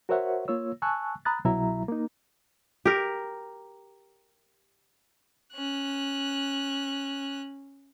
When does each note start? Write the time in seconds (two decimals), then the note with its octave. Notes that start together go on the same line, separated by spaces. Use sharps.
0.09 F#4 A#4 C5 C#5 E5 F#5
0.48 A#3 F4 C#5 E6
0.82 G#5 A5 C#6 E6 F#6
1.25 A#5 B5 D#6 F#6 A6
1.45 C2 B2 F#3 E4 E5 A#5
1.88 A#3 D#4
2.85 G4 A#4
5.53 C#4 F#6